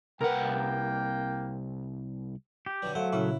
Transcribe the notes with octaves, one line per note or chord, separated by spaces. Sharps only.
C2 A#3 A#4 B4 F#5 G5
G4
G2 D3 F#3
F#3 A3 C5 F5 F#5
A#2 C#3 C#4 E4